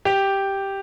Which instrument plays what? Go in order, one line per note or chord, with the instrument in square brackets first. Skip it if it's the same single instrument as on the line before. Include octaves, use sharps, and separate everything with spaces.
[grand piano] G4